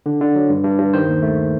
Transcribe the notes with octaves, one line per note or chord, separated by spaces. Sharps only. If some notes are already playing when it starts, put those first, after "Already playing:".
D3
D3
F#3
G2
G2
G2
D#3 C5
D#2
A3